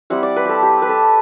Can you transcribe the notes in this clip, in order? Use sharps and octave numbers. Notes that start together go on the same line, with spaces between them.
G3 C4 E4 F#5
D5
B4
G4 A4
G4
B4
A4